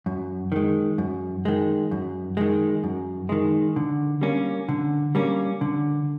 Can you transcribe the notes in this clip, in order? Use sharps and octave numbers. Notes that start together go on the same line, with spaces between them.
F#2
D#3 G#3
F#2
D#3 G#3
F#2
D#3 G#3
F#2
D#3 G#3
D3
G3 A#3 C#4
D3
G3 A#3 C#4
D3